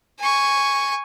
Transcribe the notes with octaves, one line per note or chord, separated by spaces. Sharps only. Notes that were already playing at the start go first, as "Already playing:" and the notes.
G#5 C#6